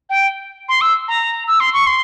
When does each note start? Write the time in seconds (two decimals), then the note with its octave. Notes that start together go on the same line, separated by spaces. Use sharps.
0.09 G5
0.69 C6
0.81 E6
1.08 A#5
1.47 E6
1.60 C6
1.73 C#6
1.87 C6